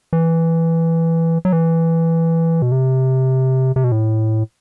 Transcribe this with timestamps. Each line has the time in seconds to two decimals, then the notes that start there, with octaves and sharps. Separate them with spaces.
0.13 E3
1.45 F#3
1.53 E3
2.62 B2
2.72 C3
3.76 C3
3.84 B2
3.92 A2